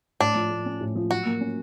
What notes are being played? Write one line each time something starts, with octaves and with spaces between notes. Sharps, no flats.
A2 D4
F3
A3
C#4
A2
F3
F#3 F#4
A#3
C#4